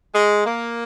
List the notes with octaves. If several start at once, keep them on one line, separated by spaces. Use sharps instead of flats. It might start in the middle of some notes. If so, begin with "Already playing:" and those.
G#3
A#3